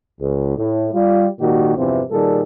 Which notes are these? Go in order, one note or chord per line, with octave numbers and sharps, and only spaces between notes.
C#2
A2
G3 F4
G#1 A#2 D#3 A#3 F#4 G4
E2 G2 C3 E3 F3 C4
A#2 D#3 G3 G#4 A4